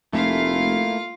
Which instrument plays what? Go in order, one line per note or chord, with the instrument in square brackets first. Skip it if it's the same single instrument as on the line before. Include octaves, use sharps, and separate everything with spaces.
[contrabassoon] F1 [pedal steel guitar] A3 A#3 E4 [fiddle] F4 F5